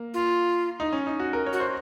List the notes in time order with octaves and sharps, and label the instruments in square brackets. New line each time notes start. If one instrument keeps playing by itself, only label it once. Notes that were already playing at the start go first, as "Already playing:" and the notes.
Already playing: [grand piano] A#3
[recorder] F4
[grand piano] D#4
C#4
D#4
F#4
A#4
C#5
[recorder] F#4
[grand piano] C5